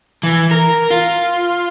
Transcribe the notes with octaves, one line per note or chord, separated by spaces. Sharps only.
E3
A#4
F4